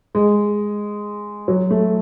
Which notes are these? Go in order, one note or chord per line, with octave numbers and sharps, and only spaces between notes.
G#3
F#3
A3